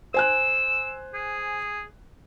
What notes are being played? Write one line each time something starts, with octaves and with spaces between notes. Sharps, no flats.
C5 G#5 E6 F#6
G#4